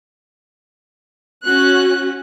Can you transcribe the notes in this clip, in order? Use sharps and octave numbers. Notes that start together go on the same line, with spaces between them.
C#4 F#4 F#6